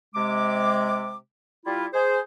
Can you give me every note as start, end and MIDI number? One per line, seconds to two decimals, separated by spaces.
0.15 1.16 48
0.15 1.16 56
0.15 1.16 86
1.66 1.86 55
1.66 1.86 64
1.66 1.86 65
1.93 2.19 68
1.93 2.19 72